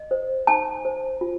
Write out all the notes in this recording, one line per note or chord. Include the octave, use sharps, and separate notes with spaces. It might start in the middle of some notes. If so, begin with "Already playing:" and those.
Already playing: D#5
C5
D#4 A5
C5
F4